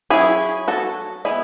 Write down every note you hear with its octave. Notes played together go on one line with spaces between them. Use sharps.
F#3 C#4 E4 G#4
F#4 A4
G#3 B3 E4 G#4